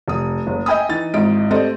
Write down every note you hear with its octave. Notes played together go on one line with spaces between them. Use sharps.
F1 D#6
F#1
D#5 E5 G5 G#5 B5 D#6
E3 D#4 A6
G#1 G#2 E4 D#5 D7
A3 C4 G4 A4 D5 D#5